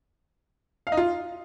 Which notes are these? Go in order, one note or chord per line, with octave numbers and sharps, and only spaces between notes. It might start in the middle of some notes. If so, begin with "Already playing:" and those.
F5
D#4
F4